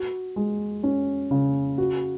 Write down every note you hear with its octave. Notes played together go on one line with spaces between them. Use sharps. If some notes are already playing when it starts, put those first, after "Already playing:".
Already playing: F#4
G#3
C#4
C#3
F#4